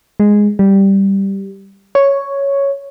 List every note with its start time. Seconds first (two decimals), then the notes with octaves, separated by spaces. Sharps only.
0.20 G#3
0.59 G3
1.95 C#5